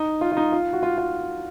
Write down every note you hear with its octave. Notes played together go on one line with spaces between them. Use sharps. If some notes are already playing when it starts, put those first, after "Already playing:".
Already playing: D#4
F4
F4
D#4
F4
F#4
F4
F4